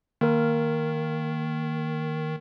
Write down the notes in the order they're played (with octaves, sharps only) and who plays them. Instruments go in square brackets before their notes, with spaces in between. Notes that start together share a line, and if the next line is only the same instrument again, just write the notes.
[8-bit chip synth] D#3 [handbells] A#3 A#4